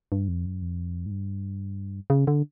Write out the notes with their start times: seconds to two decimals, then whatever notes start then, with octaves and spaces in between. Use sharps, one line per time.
0.12 G2
0.28 F2
0.46 F#2
0.62 F2
1.06 G#2
1.11 G2
2.10 C#3
2.27 D3